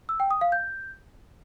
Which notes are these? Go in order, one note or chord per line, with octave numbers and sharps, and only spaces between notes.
E6
G5
D#6
F5
G6